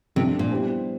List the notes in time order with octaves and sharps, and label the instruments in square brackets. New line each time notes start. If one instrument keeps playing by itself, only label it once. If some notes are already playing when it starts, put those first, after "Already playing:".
[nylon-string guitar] C3 [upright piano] F3 A3 D4 F4
[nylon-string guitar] A#2
[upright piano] G3 B3 E4 G4 C5